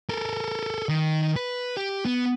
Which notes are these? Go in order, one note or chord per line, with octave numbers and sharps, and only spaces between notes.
A4 A#4
D#3
B4
G4
B3